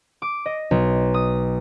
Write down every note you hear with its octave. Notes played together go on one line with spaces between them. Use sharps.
D6
D#5
B1
D#6